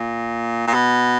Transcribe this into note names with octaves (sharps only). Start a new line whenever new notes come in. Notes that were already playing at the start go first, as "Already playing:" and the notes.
Already playing: A#2
A#2
B2